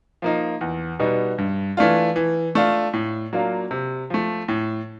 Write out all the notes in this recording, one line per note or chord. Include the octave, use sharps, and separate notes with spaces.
F3 A#3 D#4
E2
B2 G3 B3 D#4
G2
E3 A3 D4 F4
E3
A3 D4 F4
A2
F#3 A#3 D4 F4
C3
F3 A3
A2